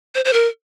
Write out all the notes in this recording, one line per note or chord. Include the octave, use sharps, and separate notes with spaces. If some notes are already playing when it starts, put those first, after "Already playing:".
C5
C5
A#4